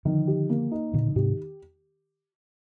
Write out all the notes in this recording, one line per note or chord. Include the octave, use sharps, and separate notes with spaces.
D3 D#3 F3
G4
A#3
D#4
A#2 D3 D#3
D3
G#2 C3 G4